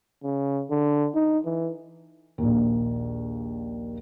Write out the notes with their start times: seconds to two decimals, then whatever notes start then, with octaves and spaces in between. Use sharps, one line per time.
0.23 C#3
0.70 D3
1.15 D#4
1.45 E3
2.38 A#1 D#2